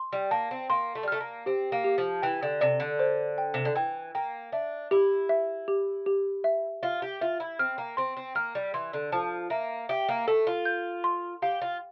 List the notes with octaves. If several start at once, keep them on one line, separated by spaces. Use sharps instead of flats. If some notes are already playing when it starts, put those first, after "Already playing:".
Already playing: C6
G3
A#3 A5
C4
A#3 C6
A3
G3
A3 F6
A#3
C4 G4
A#3
G4
F3
E3 G5
D3
C3 D5
D3
C5
G5
C3
D3
E3 G5
A#3 G5
D4 E5
E4 G4
E5
G4
G4
E5
F4 E5
G4
F4 E5
E4
C4 F6
A#3
C4 C6
C4
A#3 F6
G3
E3 C6
D3
F3 A5
A#3 E5
G4 E5
A#3
A3 A4
F4
G6
C6
G4 F5
F4